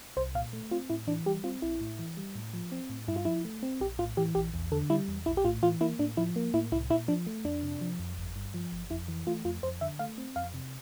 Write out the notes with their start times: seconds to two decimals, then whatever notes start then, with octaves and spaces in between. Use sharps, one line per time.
0.17 C2 C5
0.35 A#2 F5
0.53 A3
0.71 C4 F4
0.90 A2 E4
1.07 E3 D4
1.26 G3 G4
1.44 C4 F4
1.62 A#1 E4
1.81 A2
1.99 E3
2.17 G3
2.35 A2
2.54 F3
2.72 C4
2.90 A2
3.08 G2 E4
3.16 F4
3.25 F3 E4
3.45 A3
3.63 C4
3.80 A#1 G4
3.99 A2 F4
4.17 E3 G4
4.35 A#1 G4
4.54 E2
4.72 D3 A4
4.90 G3 E4
5.08 E2
5.26 A#1 E4
5.37 G4
5.44 A2 F4
5.63 E3 F4
5.81 A#3 E4
5.99 A2 D4
6.17 F3 E4
6.36 A#3
6.54 A2 E4
6.72 C2 E4
6.90 A#2 E4
7.08 F3 D4
7.27 A3
7.45 F2 D4
7.63 C3
7.81 F3
7.99 F2
8.17 G1
8.36 G2
8.54 F3
8.72 G1
8.90 F2 E4
9.08 E3
9.27 A3 F4
9.45 F2 F4
9.63 F2 C5
9.81 D3 E5
9.99 A3 F5
10.18 C4
10.36 F2 F5
10.54 C3